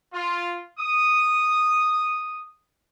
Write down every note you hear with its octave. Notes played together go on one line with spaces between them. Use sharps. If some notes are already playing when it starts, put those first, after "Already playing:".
F4
D#6